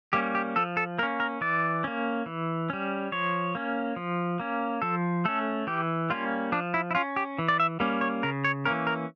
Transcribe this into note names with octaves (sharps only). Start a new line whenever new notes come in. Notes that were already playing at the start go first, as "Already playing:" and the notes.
G3 A#3 C#4 G4
G4
F3 A4
A4
A#3 C#4 A#4
A#4
E3 D5
A#3 C#4
E3
G3 C#4
F3 C#5
A#3 C#4
F3
A#3 C#4
F3 A4
A3 C#4 A4
E3 G4
G3 A#3 C#4 F4
F3 D4
E4
E4
C#4 F4
G4
E3
D5
E5
G3 A#3 C#4
C#5
C#3 A#4
C#5
E3 A#3 C#4 A#4
A#4